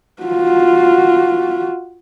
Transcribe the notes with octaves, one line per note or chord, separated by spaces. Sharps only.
F4 F#4